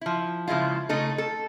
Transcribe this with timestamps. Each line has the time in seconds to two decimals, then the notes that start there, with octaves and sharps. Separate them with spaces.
0.01 F3 E4
0.48 C#3 F3 G#3 E4 F4
0.89 C#3 A3 D#4 A4
1.18 A4